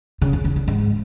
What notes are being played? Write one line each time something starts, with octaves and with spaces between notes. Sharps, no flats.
C#3
F2
E2
D3
G#2